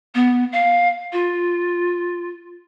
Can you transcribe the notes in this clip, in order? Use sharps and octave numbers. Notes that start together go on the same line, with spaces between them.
B3
F5
F4